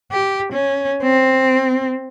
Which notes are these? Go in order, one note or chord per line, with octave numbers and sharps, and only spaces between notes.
G4
C#4
C4